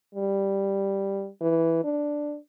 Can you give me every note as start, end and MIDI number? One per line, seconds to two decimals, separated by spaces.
0.15 1.28 55
1.41 1.80 52
1.84 2.37 62